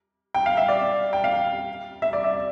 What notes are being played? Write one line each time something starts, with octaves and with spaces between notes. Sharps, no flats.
G5
F5
E5
D5
G5
F5
E5
D5
E5